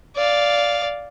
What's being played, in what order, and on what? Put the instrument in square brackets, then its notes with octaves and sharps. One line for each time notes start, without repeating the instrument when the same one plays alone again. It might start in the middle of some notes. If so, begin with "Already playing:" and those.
[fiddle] D5 F5